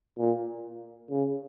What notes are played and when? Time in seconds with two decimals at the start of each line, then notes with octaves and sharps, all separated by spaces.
0.18 A#2
1.10 C#3